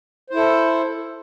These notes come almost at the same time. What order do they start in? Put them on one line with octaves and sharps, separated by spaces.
C5 E4 A4